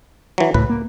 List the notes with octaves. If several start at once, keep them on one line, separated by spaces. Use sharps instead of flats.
E3 F#3
C#2 A2 B4
A#3